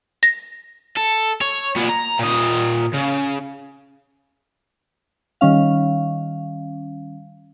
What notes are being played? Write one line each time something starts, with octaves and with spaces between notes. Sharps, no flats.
A#6
A4
C#5
A#2 B3
A#5
A#2 D#5
C#3
D#3 G3 C#4 F5